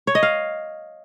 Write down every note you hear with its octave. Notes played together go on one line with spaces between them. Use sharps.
C#5
D#5
F5